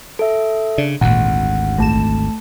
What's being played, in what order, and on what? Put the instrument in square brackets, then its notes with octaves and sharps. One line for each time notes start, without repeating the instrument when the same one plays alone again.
[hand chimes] A4 E5
[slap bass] C#3 [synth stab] D4
[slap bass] G#1 D2 [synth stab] A#2 [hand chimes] F#5
[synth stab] A#1 E7 [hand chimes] A3 A5